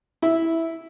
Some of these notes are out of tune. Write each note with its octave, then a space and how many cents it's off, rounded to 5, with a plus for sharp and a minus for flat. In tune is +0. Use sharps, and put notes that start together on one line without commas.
E4 -5